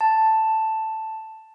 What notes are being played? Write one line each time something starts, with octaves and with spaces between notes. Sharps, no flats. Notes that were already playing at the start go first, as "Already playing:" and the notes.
A5